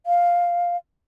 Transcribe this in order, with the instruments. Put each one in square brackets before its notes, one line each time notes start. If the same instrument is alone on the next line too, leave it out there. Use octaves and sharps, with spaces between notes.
[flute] F5